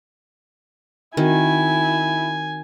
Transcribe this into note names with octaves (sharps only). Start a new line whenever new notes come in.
D#3 C4 E4 F#4 A#4 G#5